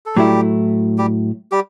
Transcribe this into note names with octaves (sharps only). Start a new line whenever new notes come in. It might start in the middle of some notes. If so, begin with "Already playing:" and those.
A4
A2 F#3 G3 A3 E4 G4
G3 G4
G3 G4